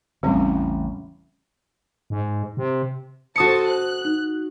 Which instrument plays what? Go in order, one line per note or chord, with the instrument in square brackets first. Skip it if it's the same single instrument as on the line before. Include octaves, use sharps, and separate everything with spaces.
[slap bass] A1 E2 C#3 [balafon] G3 C4 C#4
[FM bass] G#2
C3
[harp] F#4 D#6 C#7 [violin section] A4 C5 A5
[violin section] F#6
[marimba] D#4